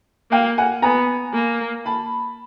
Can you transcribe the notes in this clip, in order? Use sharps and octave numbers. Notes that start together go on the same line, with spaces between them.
A#3 F5 G5
F#5 G#5
B3 G#5 A#5
A#3
A5 B5